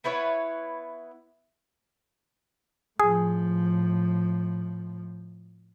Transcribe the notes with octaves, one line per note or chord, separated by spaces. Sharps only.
B3 E4 B4 C#5
A2 F3 G#4